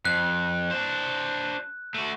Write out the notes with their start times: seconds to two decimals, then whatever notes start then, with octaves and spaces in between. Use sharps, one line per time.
0.05 F2 F#6
0.71 D4 C5
1.94 A3 F#4